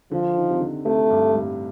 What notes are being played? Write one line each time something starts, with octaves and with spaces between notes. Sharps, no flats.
D3 F3
D#3
C3
D3
C3 A3
G2
A2